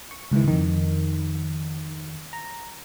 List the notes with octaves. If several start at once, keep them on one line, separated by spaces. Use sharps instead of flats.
C#6
C#2 G#2 D#3 E3
F2 D#3
A#5